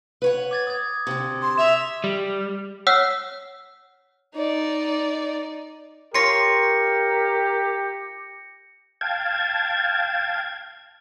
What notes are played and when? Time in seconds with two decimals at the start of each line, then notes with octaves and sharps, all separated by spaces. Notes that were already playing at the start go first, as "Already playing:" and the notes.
0.22 B4 C#5 F#5
0.51 D6 G#6 A6
0.67 D#6 G#6
1.07 D2 C3
1.42 C6
1.58 E5 E7 F7
2.04 G3
2.87 C#5 F#5 E6 F6 B6
4.35 D#4 D5
6.14 F4 G4 A#4 C#5 C6 A#6 C#7
9.01 F5 G5 A5 G#6